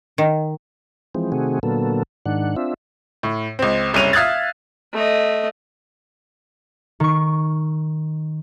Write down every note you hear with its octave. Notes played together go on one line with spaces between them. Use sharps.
D#3
E3 F3 G#3 C4
C3 D#3 A3 C4 F#4 G#4
A#2 D3 F#3 A#3 B3 A4
G#2 D#3 D4 F#5
C4 D4 F4 E5
A2
C#2 C4
F#1 C2 C#4 D#7 F7
E5 F5 D#6 F#6 G#6 A6
A3 D#5
D#3 C#6